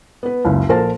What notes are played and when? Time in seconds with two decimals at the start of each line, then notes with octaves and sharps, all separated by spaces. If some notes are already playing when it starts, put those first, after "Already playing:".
0.23 B3 B4
0.45 F#1 C#2
0.69 A#1 A4 A#4 C5 A5